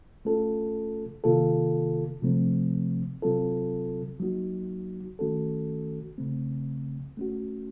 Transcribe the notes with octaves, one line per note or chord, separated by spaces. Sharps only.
A3 C#4 F4 A4
C3 D#3 A#3 F4 A4
C3 F3 A3 C4
C3 F#3 C4 F4 A4
F#3 A#3 D#4 F#4
D#3 A3 C#4 F#4 A4
C#3 A3 C4
A3 C#4 F#4